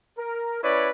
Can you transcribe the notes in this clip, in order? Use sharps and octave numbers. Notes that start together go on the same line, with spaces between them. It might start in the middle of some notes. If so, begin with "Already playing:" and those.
A#4
C#4 E4 B4 C#5 D5